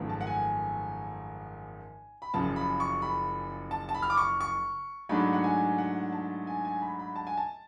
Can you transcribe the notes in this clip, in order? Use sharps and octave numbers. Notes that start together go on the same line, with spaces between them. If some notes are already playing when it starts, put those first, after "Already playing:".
Already playing: G#1 F#2 C#3 F3 A3
A5
F#5
G#5
B5
F#1 F#2 C#3 F3 A5
B5
C#6
B5
A5
A5
B5
F6
D6
C#6
C#6
G#2 F#3 A3 D4 B5
F#5
G#5
F#5
A5
G#5
G#5
B5
B5
A5
G#5
A5